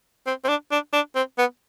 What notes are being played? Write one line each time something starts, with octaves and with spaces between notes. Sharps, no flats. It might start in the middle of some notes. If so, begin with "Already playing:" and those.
C4
C4
D4
D4
D4
C4
B3